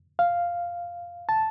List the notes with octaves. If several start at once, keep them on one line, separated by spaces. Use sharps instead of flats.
F5
A5